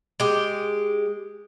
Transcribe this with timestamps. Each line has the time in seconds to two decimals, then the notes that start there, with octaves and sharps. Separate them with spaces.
0.20 G#3 G4